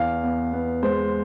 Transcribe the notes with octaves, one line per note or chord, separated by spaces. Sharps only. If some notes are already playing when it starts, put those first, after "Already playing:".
Already playing: E2 F5
B3
B3
G#3 C5